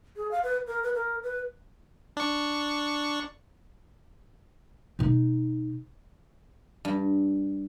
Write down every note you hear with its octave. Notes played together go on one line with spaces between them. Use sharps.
G#4
F5
B4
A#4
B4
A#4
B4
D4 C#6
B2 D#4
G2